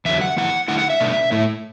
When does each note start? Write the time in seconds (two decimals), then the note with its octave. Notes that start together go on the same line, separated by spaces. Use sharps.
0.05 E2 D3 F#3 E5
0.21 F#5
0.37 A2 E3 B3 E4 F#5
0.68 D3 A3 E4 F#5
0.79 F#5
0.90 E5
1.00 B2 A3 D4
1.31 A2 A3 E4